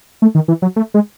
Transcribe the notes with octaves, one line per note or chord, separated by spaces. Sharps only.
A3
D#3
E3
F#3
A3
G#3